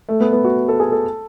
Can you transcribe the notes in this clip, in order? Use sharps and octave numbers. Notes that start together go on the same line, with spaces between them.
A3
B3
B3
F#4
A4
G#4
A4